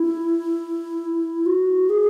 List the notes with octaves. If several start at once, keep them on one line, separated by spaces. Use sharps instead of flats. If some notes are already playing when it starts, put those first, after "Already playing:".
Already playing: E4
F#4
G#4